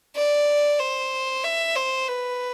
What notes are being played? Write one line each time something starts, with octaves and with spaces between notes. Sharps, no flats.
D5
C5
E5
C5
B4